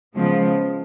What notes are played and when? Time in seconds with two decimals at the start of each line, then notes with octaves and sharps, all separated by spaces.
0.15 C#3 F3 G#3 B3